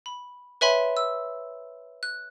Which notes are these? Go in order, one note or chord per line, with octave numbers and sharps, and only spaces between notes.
B5
B4 C#5 E5 G#5 B5 C6
E6
F#6